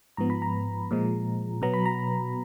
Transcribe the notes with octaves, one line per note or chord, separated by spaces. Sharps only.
G#2 F3 B3 A#5
B5
A#5
A#2 F3 G#3
B2 F#3 B3 A#5
B5
A#5